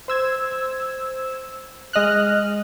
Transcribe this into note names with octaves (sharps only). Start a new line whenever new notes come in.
C5 E6 G#6
G#3 D#5 F6 F#6